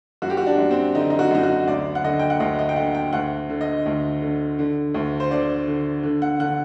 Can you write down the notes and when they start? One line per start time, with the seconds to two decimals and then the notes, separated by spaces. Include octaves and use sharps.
0.22 F#2 F#4
0.30 G4
0.37 F#4
0.47 D4
0.58 F#2
0.71 C4
0.94 D3 D#4
1.10 D#4
1.19 F#4
1.31 F#2 D#4
1.43 F#4
1.67 D2 D5
1.95 F#5
2.04 D3 D#5
2.19 G5
2.30 F#5
2.40 D2 D#5
2.59 D#5
2.69 G5
2.76 D3 F#5
2.95 G5
3.13 D2 F#5
3.49 D3
3.61 D#5
3.86 D2
4.22 D3
4.59 D3
4.94 D2
5.20 C5
5.31 D3 D5
5.68 D3
6.03 D3
6.22 F#5
6.39 D3 F#5